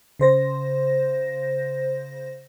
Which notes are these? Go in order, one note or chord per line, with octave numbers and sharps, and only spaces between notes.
C#3 C5 A#6